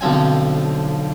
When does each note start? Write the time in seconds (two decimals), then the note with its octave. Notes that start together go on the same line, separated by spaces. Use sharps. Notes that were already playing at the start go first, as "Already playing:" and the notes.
0.01 B1 D3 F3 C4 G#5